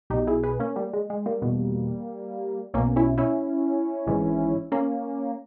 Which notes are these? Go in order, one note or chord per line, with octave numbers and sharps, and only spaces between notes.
B1 B2 D#4 G4
E4 G#4
G#4 B4
A#3 C#4
G3 A#3
G#3
G#3
G3 A#3
E2 B2
B1 B2 A#3 C#4
C#4 E4
C#4 E4
G#1 G#2 E3
A#3 C#4